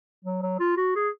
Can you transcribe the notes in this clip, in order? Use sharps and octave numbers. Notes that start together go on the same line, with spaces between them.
F#3
F#3
F4
F#4
G#4